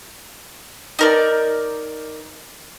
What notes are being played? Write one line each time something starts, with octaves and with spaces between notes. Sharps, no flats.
D#4 A#4 D5